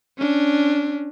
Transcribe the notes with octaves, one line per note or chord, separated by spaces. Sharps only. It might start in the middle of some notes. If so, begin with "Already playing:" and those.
C#4 D4